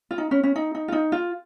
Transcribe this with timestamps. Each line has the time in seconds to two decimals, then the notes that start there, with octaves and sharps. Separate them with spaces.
0.11 F4
0.18 D#4
0.31 C#4
0.43 C#4
0.56 D#4
0.75 D#4
0.88 F4
0.92 D#4
1.12 F4